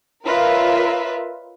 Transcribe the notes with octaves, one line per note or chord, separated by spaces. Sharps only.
F4 A#4 B4 C#5 D#5 E5